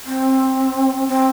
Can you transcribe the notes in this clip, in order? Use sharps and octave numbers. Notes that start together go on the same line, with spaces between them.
C4
C4